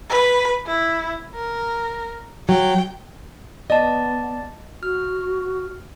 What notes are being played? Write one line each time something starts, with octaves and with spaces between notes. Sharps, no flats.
B4
E4
A#4
F#3 G5
B3 D5 D#5 A5
F#4 F6